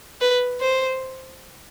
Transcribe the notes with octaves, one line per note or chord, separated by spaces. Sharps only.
B4
C5